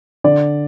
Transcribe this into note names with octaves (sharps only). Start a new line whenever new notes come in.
D3 D5